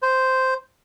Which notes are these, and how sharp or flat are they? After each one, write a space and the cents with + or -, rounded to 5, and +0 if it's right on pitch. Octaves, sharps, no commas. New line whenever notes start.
C5 -5